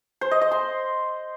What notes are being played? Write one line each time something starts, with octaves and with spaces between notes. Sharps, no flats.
C5
D#5
D#5
C6